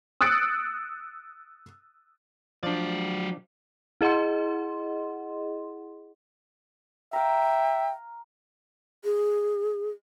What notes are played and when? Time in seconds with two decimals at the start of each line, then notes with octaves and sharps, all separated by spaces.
0.21 D#6 E6 F#6 A6 C#7 D7
2.63 F3 F#3 D4 D5
4.01 E4 G#4 D#5 F#5 C6
7.13 E5 F5 G5 A#5
9.04 G#4